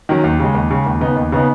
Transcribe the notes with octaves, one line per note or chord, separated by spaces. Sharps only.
D#3 F#3 C#4
D#2
C#3 G#3
D#2
C#3 G#3
D#2
C#3 B3 D#4
D#2
C#3 B3 D#4